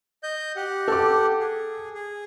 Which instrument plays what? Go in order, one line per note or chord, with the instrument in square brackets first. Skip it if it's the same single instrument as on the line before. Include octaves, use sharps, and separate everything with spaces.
[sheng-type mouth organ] D#5 G6
G4 F#5
[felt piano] A4 D6
[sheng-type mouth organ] G#4
G#4